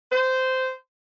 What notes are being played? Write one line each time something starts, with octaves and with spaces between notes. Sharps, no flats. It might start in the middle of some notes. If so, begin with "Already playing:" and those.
C5